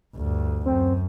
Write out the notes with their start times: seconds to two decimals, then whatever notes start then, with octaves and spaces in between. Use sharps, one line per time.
0.16 D2 G2
0.66 F#2 C4